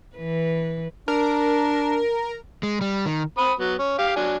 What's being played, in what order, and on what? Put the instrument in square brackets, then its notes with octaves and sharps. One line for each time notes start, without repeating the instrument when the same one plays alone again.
[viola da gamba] E3 B4
[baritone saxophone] D4 [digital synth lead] A#4
[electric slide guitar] G#3
G3
D#3
[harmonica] C4 B5 D#6
F#3 B3
C#4
G4 F5
F#3 D4 G#5